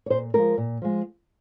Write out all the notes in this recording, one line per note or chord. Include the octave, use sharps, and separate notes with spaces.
C#5
A#2 C5
F3 G#3 A#4
A#2
F3 G#3